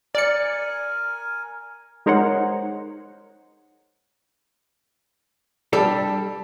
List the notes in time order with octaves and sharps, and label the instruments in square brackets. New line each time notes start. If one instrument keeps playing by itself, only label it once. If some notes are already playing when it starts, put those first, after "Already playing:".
[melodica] A#4 G#5 [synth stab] D5 C#7
[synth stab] G#3 D#4 A#4 C5 C#5 F#5
[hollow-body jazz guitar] G3 D4 A4